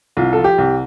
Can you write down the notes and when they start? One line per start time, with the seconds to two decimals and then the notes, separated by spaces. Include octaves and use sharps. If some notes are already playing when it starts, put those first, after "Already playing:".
0.17 C2 F4
0.33 A4
0.38 F3
0.44 G4
0.58 C2